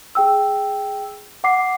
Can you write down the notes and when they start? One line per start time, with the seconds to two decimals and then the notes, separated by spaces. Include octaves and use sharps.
0.15 G#4 G5 E6
1.44 F#5 D6 C7